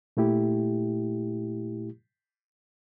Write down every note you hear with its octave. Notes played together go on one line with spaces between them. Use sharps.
A#2 A3 E4 G4